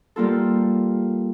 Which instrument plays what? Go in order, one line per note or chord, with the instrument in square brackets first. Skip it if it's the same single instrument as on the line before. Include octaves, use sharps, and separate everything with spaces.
[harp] G3 A#3 F4 A4